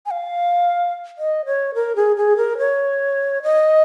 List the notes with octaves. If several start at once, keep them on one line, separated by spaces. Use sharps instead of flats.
G#5
F5
D#5
C#5
A#4
G#4
G#4
A#4
C#5
D#5